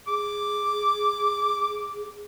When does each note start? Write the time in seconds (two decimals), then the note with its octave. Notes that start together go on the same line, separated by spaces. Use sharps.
0.08 G#4 D6